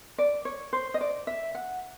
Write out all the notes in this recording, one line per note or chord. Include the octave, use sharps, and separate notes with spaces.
D5
C#5
C5
D#5
D5
E5
F#5